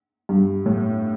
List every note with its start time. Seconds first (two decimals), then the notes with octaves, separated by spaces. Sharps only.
0.29 G2
0.66 A2